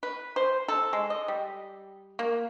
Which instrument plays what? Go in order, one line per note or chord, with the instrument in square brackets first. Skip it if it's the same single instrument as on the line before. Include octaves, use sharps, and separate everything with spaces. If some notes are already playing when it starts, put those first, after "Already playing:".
[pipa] B4
C5
A4
G#3
D#5
G3
A#3